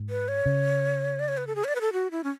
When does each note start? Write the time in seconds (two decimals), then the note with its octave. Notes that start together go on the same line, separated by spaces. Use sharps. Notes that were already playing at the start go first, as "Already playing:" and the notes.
Already playing: G#2
0.10 B4
0.28 C#5
0.46 C#3
1.19 D5
1.28 C#5
1.37 B4
1.47 A4
1.56 G#4
1.64 C#5
1.68 D5
1.75 B4
1.81 A4
1.93 F#4
2.11 E4
2.24 C#4